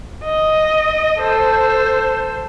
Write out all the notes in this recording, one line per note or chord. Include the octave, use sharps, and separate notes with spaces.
D#5
A4 C5